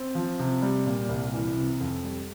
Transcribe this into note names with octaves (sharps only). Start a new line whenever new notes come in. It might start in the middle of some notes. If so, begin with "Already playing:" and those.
Already playing: C4
F3
C3
G3
A#2
C2
E3
C3
F2
G3